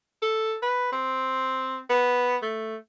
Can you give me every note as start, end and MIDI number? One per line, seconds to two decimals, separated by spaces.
0.22 0.57 69
0.62 0.89 71
0.92 1.80 60
1.89 2.36 59
2.42 2.76 57